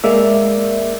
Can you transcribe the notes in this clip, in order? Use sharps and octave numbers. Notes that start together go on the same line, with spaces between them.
G#3 A#3 D5 E5